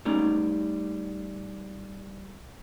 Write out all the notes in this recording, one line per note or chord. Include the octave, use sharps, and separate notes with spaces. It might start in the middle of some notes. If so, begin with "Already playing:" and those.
G3 A3 C#4 D#4